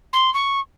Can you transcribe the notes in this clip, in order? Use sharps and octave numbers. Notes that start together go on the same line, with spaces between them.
C6
C#6